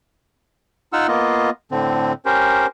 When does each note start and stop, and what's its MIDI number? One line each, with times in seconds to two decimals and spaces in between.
0.93 1.07 63
0.93 1.07 65
0.93 1.07 78
0.93 1.07 88
0.93 1.07 89
1.08 1.50 58
1.08 1.50 59
1.08 1.50 65
1.08 1.50 75
1.72 2.13 45
1.72 2.13 50
1.72 2.13 60
2.25 2.67 61
2.25 2.67 67
2.25 2.67 70
2.25 2.67 72